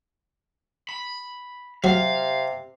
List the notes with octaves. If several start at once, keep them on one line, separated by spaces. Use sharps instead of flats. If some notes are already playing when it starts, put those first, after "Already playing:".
B5
C3 F#3 F5